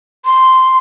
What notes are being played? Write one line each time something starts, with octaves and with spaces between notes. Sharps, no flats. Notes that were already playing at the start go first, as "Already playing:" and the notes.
C6